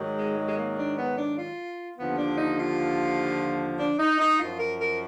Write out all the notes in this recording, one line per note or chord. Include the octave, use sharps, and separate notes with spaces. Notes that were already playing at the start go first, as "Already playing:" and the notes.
Already playing: G#2 D#3 F#3
G#3
G#3
G#3
A#3
D4
B3
D4
F4
D#2 D3 F3 B3
D4
D#4
F4
D4
D#4
D#4
F#2 F3 F4
A#4
A#4